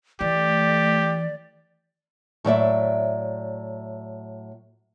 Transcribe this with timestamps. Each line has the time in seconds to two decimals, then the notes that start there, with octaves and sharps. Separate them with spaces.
0.21 E3 A3 G4 D5
2.44 A2 F#3 D5 E5